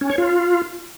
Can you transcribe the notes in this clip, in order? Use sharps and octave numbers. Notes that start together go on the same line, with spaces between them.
C#4
C#5
F4